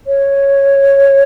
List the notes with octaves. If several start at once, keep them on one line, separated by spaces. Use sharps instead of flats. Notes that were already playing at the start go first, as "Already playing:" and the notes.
C#5